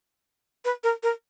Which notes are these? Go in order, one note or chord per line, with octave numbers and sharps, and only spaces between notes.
B4
A#4
A#4